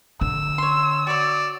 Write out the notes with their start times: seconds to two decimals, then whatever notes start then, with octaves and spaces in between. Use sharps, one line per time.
0.21 D3 E6
0.58 C#5 C6
1.07 F#4 C#5 D5